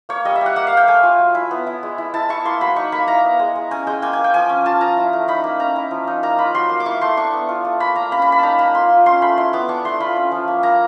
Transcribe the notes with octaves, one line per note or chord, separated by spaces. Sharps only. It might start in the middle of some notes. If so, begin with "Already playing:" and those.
A#3 C#5
G3 D#5
E5
G3 F#5
A#3 F#5
F5
A#3 G5
A3 G#5
F4
F#3
E4
B3
E4
G#3
E4
E4 A5
E4 C#6
A#3 C6
F#3 B5
D#4 C#6
A#3 B5
E4 A#5
B3
G#3
G#3
C#4 G#5
G#3 G5
A#3 G#5
G#5
A#3
G5
F3 G#5
C#4
F4 A5
F3 A#5
E4
A3
D#4 B5
A#3
C#4 A#5
E4
F3
D#4
A#3 A#5
F4 B5
F#3 C6
A#3
D6
E4 C#6
A3 C6
D4 C#6
B3
F4
A3
A#3 B5
A#3 A#5
C#4 B5
B5
A#3
B5
D#4 A5 A#5
A#3 B5
F4 C6
F4
C#4 C6
A3 B5
E4 C6
B3 D6
D4 C#6
A3 C6
F4 B5
C#4
F3
A#3
A#3 A#5